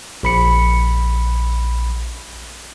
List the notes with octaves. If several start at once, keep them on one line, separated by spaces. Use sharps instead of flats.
A#1 B5 C#7